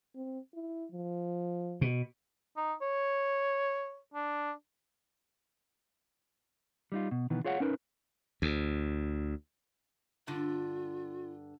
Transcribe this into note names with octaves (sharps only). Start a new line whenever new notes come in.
C4
E4
F3
B2
D#4
C#5
D4
G3 D#4 F4
B2
B2 D#3 E3 B3
F4 G#4 C#5 F5 F#5
C#4 D#4 A#4 B4
D2
G2 D3 F4